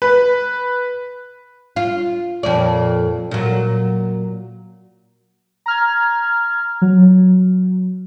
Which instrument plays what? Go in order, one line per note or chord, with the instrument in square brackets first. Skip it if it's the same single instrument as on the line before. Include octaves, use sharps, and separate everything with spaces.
[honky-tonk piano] B4
[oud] F4
F2 A#2 D5
A#2 F#3
[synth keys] A#5 F6 G#6
F#3